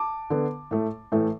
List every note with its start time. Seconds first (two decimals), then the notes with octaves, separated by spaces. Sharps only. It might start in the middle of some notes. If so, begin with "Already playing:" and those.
Already playing: A5 D6
0.30 D3 B3
0.71 A2 A3
1.12 A2 E3 A3